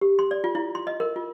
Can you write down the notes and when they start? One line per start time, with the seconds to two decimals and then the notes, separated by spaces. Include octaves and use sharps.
0.01 G4
0.19 C6
0.31 D5
0.44 F4
0.55 E4
0.75 C6
0.87 D#5
1.00 A#4
1.16 F4